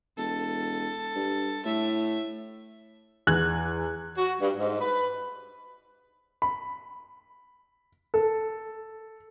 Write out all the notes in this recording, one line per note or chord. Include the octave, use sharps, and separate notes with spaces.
E1 A4
G2
A2 E5
E2 F#6 G#6
F#4
G2
G#2
B4
B5
A4